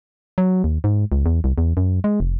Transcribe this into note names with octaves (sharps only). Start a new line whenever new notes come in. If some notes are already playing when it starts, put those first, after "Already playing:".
F#3
D#2
G#2
C#2
E2
C2
E2
F#2
G#3
F1